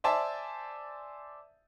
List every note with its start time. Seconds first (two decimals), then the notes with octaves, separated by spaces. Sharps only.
0.04 C5 D5 E5 G#5 A5